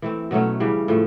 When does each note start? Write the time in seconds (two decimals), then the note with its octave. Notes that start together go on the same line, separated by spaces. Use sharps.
0.02 E3 A3 C4
0.31 B2 F#3 A3 C#4
0.60 C#3 E3 G3
0.88 A2 F3 A3